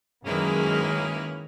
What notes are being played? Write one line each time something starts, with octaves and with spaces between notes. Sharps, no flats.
F#2 D#3 G#3 A#3 C#4 E4 B4